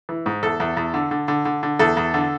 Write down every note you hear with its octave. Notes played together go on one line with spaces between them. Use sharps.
E3
G#2
E2 A4
E2
E2
D3
D3
D3
D3
D3
E2 A4
E2
D3